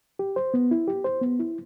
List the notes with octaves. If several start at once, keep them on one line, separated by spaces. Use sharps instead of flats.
G4
C5
B3
E4
G4
C5
B3
E4